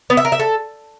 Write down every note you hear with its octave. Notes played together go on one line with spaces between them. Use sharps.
B3
E5
A#4
E5
A4